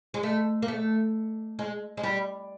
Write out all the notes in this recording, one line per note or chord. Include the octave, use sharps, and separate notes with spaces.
G#3
A3
A#3
A3
G#3
G#3
G3